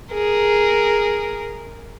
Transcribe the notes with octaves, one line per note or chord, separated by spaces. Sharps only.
G#4 A#4